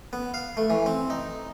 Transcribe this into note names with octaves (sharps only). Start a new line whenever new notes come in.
B3
F5
A3
E3
C4
D#4